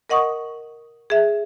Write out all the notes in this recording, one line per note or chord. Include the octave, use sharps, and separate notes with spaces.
A#4 D#5 F#5 C#6 D#6
G#4 E5